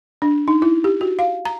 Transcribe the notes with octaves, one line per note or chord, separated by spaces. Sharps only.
D4
D#4
E4
G4
F#4
F5
A#5